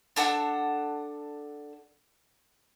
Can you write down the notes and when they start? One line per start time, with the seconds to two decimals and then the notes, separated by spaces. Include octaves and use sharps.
0.16 D4 A4 F#5 E6